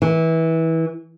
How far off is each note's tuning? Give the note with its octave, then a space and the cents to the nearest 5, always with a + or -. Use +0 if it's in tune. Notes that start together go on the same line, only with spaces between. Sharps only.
E3 -20